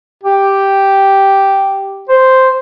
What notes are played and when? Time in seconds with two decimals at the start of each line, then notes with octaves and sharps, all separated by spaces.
0.24 G4
2.09 C5